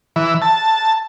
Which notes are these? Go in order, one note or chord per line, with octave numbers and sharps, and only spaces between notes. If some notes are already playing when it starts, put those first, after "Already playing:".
E3
A5